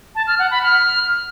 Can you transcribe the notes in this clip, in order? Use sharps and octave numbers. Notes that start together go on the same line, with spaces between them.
A5
F6
F#5
B5
F6